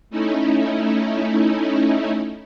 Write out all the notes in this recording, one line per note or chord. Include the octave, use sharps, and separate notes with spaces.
A3 C#4 D#4 E4